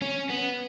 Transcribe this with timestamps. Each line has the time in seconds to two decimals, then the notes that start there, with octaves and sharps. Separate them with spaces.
0.02 C#4
0.30 B3